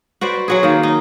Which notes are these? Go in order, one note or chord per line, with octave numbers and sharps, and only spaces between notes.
F#4 B4 C5 D5
F#3 F#4 G#4
D#3 A#3
D#4